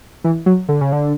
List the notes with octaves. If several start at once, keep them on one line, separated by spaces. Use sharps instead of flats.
E3
F#3
D3
C#3
D3